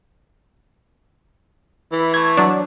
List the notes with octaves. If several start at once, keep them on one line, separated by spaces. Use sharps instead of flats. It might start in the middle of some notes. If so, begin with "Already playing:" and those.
E3 E4
A3 G#6
F#3 D4